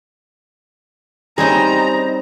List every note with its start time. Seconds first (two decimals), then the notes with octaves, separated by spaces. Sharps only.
1.38 G3 C4 C#4 D#4 G4 G#4 A#5